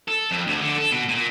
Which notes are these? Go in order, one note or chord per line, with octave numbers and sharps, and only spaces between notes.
A4
F2
D2
D3
A4
B2
A#2